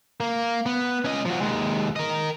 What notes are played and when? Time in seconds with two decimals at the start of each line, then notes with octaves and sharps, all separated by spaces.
0.20 A#3
0.66 B3
1.05 C#4 D#5
1.25 F3 F#4
1.41 D#2 G#3
1.96 A#4 D#5